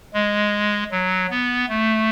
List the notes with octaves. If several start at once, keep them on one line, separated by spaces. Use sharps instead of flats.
G#3
F#3
B3
A3